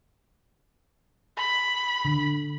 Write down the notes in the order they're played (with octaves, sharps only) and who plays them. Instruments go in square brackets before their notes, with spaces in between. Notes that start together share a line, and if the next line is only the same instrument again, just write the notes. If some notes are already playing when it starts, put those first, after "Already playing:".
[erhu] B5
[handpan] D3